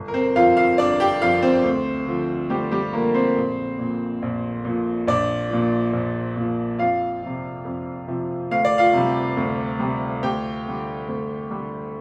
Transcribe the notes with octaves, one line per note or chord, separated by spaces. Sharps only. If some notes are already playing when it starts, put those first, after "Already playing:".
Already playing: G1
A#4
C4 C5
F2 F3 F4 F5
F4 F5
G1 D4 D5
G4 G5
F2 F3 F4 F5
C4 C5
D2
D3 F3
D2 G3 G4
G3 G4
D3 F3 A#3 A#4
C4 C5
A#1
A#2 F3
A#1
A#2 F3
A#1 D4 D5
A#2 F3
A#1
A#2 F3
F2 F4 F5
C3 F3
F2
C3 F3
D2 F5
D5
F4 F5
C3 G3
D2
C3 G3
D2 G4 G5
D3 G3
D2
D3 G3